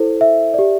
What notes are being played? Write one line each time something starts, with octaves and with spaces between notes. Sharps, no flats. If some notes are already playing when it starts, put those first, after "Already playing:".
Already playing: E4 A4 C5
E5
G4 D5